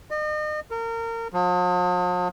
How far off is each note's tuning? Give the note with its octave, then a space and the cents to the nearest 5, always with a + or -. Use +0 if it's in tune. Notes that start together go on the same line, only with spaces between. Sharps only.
D#5 -40
A#4 -30
F3 +45